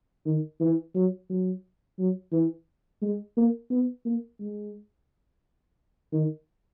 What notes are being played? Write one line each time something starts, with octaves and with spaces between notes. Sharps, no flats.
D#3
E3
F#3
F#3
F#3
E3
G#3
A#3
B3
A#3
G#3
D#3